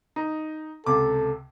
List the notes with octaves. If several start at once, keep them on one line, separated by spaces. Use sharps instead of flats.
D#4
C#2 C3 A4 D6